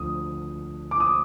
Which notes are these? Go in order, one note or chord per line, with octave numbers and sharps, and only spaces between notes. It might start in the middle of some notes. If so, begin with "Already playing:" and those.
Already playing: D2 D3 F3 D#6
D6
D#6